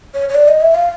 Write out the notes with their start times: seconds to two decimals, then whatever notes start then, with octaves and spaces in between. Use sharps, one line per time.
0.14 C#5
0.29 C#5
0.35 D5
0.48 D#5
0.61 E5
0.75 F5